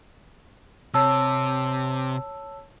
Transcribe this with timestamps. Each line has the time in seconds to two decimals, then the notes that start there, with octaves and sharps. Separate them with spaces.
0.94 C3 C#5 A5 E6